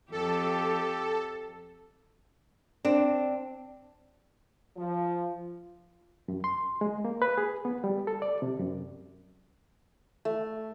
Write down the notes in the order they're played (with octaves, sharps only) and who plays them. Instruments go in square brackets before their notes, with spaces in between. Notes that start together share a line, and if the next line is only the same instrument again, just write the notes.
[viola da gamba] F2 G4 [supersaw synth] A4
[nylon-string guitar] C4 D4
[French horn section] F3
[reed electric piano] F#2
C6
G#3
A#3
B4
G#4
B3
G3
A4
D5
C3
F#2
[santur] A3